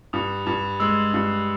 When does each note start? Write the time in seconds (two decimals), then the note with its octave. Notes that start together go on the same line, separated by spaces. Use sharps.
0.13 G2 D#6
0.46 G2
0.80 G#3 E6
1.14 G2